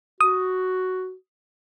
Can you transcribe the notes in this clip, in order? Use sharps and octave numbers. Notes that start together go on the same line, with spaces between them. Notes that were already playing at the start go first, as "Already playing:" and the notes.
F#4 D#6